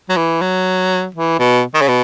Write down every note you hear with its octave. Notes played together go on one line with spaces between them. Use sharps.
F#3
E3
F#3
E3
B2
D#3
C#3
B2